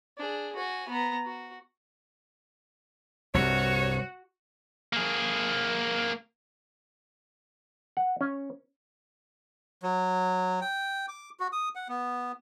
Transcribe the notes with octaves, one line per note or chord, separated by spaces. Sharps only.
D4 G#4
F#4 G#5
B3 A#5
F#4
C2 G2 F#4 C#5
A#3 G#4
F#5
C#4
F#3
G5
D6
F#4
D#6
F#5
B3